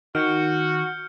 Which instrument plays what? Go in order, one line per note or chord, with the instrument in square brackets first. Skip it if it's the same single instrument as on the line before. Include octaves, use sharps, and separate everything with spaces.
[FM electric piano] D#3 [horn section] F#4 [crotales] F6 G6 C#7